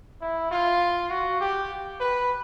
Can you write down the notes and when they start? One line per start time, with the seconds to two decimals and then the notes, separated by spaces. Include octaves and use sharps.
0.21 E4
0.51 F4
1.10 F#4
1.41 G4
2.00 B4